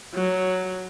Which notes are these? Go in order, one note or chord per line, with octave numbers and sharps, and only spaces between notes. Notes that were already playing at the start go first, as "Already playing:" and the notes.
F#3